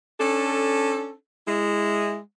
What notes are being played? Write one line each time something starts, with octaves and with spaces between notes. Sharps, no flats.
C#4 D4 A4
G#3 E4